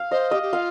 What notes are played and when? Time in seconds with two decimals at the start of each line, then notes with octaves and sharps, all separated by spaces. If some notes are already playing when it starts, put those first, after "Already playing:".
Already playing: F5
0.11 C5 D#5
0.31 G4 D#5
0.42 G4
0.53 F4 F5